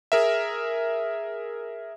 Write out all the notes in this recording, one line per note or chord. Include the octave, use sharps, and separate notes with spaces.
G#4 A#4 E5